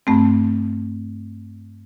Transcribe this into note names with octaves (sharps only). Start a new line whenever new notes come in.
G2 A3 C4